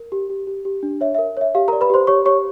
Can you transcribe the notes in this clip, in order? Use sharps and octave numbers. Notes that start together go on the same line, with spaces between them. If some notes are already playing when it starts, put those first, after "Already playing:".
Already playing: A#4
G4
G4
G4
G4
D4
C#5 E5
E5
A#4
C#5 E5
G4 F5
A#4 A#5
D5
B4 B5
G4 C5 C6
G4 C#5 C#6
G4 C#5 C#6